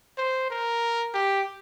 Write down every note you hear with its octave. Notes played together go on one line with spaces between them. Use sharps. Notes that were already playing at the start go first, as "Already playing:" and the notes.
C5
A#4
G4